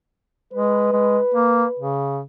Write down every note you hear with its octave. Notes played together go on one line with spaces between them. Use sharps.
G#3 B4
G#3
A#3
C#3